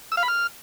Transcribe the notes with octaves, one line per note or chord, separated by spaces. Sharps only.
E6
F5
B5
F6